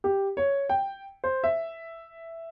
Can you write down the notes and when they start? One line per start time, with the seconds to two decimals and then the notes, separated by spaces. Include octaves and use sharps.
0.04 G4
0.37 C#5
0.69 G5
1.24 C5
1.44 E5